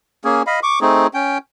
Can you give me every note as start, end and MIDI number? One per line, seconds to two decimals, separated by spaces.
0.25 0.43 58
0.25 0.43 61
0.25 0.43 68
0.47 0.60 75
0.47 0.60 77
0.47 0.60 83
0.63 0.79 85
0.63 0.79 86
0.81 1.07 57
0.81 1.07 60
0.81 1.07 63
0.81 1.07 68
1.14 1.38 61
1.14 1.38 79